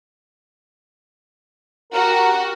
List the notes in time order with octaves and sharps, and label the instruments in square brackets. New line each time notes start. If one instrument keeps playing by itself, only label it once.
[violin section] F#4 G4 [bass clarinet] A#4